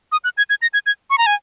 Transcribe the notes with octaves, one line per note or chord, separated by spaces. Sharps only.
D#6
F#6
G#6
G#6
A#6
G#6
G#6
C#6
A#5
G#5